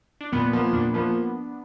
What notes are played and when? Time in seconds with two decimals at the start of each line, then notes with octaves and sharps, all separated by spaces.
0.21 D4
0.32 A#2 B3
0.53 F3 A#3
0.73 A#2 D4
0.94 F3 A#3 B3